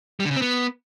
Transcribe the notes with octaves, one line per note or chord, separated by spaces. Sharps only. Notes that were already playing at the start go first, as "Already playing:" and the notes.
G3
D3
C#3
C4
B3